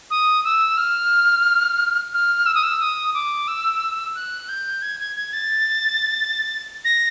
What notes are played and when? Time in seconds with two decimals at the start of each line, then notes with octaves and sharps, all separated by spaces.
0.11 D#6
0.44 E6
0.77 F6
2.13 F6
2.46 E6
2.55 D#6
2.63 E6
2.80 D#6
3.14 D6
3.48 E6
4.15 F#6
4.49 G6
4.82 G#6
5.00 G#6
5.16 G#6
5.33 A6
6.85 A#6